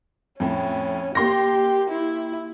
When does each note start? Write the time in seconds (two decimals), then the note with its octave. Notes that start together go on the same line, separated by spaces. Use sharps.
0.40 F2 A2 C#4
1.15 A#3 G4 C6 A#6
1.90 E4